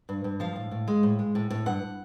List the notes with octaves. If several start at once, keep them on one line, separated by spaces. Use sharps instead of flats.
G2
G2
F3 F5
A2
A2
G#3
A2
G#3
A2
A2
G2 F#5